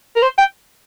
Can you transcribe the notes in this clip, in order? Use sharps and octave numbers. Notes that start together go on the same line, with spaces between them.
A#4
C5
G5